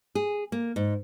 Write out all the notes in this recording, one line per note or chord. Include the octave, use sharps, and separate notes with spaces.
G#4
A#3
G#2